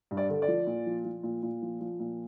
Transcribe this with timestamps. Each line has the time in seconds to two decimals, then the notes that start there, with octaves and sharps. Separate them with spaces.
0.11 G2
0.17 D5
0.30 D3
0.42 D5
0.48 F3
0.67 A#2
0.86 F3
1.05 F3
1.23 A#2
1.43 A#2
1.62 F3
1.81 F3
2.00 A#2